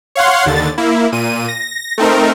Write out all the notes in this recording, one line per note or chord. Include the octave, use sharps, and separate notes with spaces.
C#5 F5 F#5 C6
D#2 D3 A6
A#3 E4
A#2 D#7
A#6
A3 C4 D#4 A#4